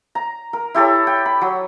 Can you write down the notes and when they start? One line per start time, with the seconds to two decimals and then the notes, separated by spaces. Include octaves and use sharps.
0.15 A#5
0.53 A#4
0.75 E4 G4 A4 C#5
1.07 G5
1.26 B5
1.41 F#3